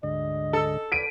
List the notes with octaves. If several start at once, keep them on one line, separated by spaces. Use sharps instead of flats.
D2 G#2 D3 D#5
A4
B4 D5 B6 D7 D#7